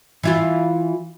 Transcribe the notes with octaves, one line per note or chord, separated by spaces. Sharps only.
E3 E4 F4